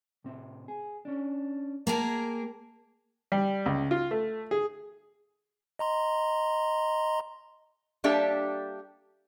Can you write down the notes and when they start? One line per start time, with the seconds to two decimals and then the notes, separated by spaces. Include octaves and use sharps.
0.24 A2 C3 C4
0.68 G#4
1.05 C#4 D4
1.87 A#3 G#4 A#4 G5 A5
3.32 G3
3.66 C#2
3.91 F4
4.11 A3
4.51 G#4
5.79 D#5 A#5 C6
8.04 G3 A#3 D4 G4 A4 E5